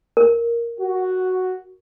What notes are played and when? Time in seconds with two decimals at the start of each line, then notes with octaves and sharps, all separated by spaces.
0.17 A#4
0.79 F#4